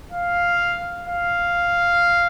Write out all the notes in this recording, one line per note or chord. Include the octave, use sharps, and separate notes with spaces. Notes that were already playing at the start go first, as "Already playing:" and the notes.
F5
F5